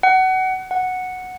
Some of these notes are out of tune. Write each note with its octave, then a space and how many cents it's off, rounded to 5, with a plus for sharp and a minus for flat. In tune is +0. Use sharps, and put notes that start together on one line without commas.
F#5 +25
F#5 -5